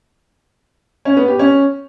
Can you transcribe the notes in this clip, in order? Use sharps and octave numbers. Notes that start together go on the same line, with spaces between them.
C#4
B3
G4
C#4